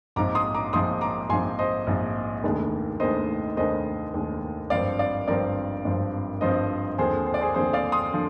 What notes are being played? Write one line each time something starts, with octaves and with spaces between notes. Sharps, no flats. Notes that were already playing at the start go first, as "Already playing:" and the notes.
A#1 G#2 F3 C4 A#5 D6
C6 D#6
A#5 D6
A#1 G#2 F3 C4 C6 D#6
A#5 D6
A#1 G#2 F3 C4 G#5 C6
C5 D#5
A#1 G#2 F3 C4
F1 D#2 D#3 G#3 D4
F1 D#2 D#3 G#3 D4 C5 D#5
F1 D#2 D#3 G#3 D4 C5 D#5
F1 D#2 D#3 G#3 D4
G#1 G2 F3 C4 D5 F5
D5 F5
G#1 G2 F3 C4 A#4 D5
G#1 G2 F3 C4
G#1 G2 F3 C4 C5 D#5
D#2 D3 F3 C4 G#4 C5
C5
D5
G#4 C5
D#2 D3 F3 C4 G#4 C5
D5 F5
C6 D#6
D3 F3